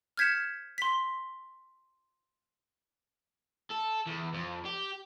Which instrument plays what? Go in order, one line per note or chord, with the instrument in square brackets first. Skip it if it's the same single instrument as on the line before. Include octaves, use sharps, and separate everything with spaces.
[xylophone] F6 G6 G#6 B6 C#7 E7
C6 B6
[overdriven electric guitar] A4
E2
F2
G4